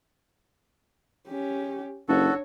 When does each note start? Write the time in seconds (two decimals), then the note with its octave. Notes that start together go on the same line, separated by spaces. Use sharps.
1.28 C#4 G4
2.09 F#1 D4 F#4 A4 C#5